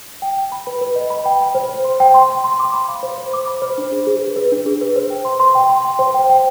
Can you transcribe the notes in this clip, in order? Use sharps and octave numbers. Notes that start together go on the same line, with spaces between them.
G5
G5
B5
B4
B4
D#5
B5
G5
G5
C5
C5
C6
G5
C6
C6
C6
D6
B5
F5
C5
C5
D6
B5
C5
D4
G#4
G#4
B4
B4
D4
G#4
B4
C5
G5
C6
C6
G5
C6
G5
C5
G5
G5